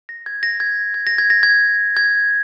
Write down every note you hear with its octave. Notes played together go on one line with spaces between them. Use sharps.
A#6
G#6
A#6
G#6
G#6
A#6
G#6
A#6
G#6
G#6